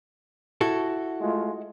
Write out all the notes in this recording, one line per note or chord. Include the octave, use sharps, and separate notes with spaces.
E4 F#4 A4
G#3 A3 F4